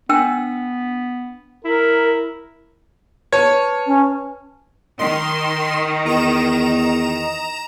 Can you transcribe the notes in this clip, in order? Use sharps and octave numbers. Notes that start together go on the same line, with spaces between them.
B3 D4 G5 E6
E4 A#4
B4 C#5 A5
C#4
D#3 D#5 C6
E2 A#5 E7